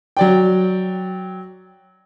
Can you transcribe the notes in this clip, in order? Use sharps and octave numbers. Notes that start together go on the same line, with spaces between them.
F#3 D5 G5